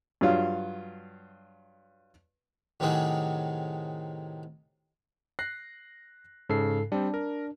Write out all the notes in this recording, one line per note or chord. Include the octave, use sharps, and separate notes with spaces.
G2 F#3 F4
A2 C3 D#3 F#3 C4 G#4
F#6 A#6 C7
G#2 C#3 A4 C7
G3 C4 D4
A#4